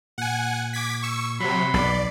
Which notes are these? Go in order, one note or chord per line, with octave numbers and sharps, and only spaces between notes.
A#2 F#5 G#5
D6 G#6 B6
C#6 E6
C3 F#3 F#5 B5 C6
B1 D5